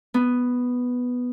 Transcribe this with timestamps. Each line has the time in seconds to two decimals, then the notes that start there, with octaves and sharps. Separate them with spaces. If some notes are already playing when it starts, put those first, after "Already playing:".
0.14 B3